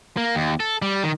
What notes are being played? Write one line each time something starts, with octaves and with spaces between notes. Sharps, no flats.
A#3
D#2
A4
G3
D#3